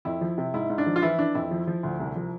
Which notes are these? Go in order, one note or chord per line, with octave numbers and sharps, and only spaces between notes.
F2 E4
F3
C3
G#2 E4
G#2
D4
F3
F4
E3 E4
E3 D4
F2 E4
F3
F3
D2
C2
F3